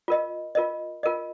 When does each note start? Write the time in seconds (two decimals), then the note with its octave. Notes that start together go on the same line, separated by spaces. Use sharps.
0.08 F4 A#4 D#5
0.55 F4 A#4 D#5
1.03 F4 A#4 D#5